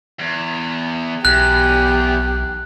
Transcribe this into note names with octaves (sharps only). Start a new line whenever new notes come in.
E2
B1 E2 G4 F#6